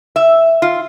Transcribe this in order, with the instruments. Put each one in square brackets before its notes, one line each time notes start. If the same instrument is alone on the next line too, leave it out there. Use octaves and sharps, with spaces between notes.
[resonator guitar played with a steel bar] E5
F4